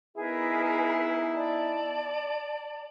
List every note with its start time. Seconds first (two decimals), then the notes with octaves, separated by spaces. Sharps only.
0.16 B3 D#4 E4 G#4 A#4 B4
1.36 D5 A5